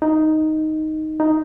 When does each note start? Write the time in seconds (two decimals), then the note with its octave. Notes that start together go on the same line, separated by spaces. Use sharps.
0.02 D#4
1.20 D#4